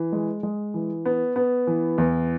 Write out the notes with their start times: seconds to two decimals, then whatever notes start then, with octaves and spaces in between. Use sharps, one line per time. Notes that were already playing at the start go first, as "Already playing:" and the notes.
Already playing: E3
0.12 G#3
0.43 G#3
0.74 E3
1.06 B3
1.36 B3
1.67 E3
1.98 E2